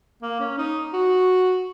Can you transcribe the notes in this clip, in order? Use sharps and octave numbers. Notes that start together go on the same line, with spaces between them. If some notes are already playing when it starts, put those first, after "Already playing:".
A#3
C#4
D#4
F#4